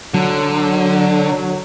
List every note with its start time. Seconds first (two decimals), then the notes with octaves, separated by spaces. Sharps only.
0.14 D3 F#3